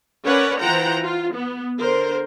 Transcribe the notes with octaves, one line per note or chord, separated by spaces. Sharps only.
C#4 A#4 B4 C#5 D5 F#5
E3 F4 C5 F#5 G5 A#5
F4
B3
D3 A#4 C5